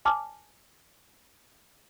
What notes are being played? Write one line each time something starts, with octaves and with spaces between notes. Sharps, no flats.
G#5 A5 D6 F6